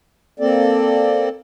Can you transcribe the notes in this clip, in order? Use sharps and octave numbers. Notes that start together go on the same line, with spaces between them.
A#3 C4 A4 D5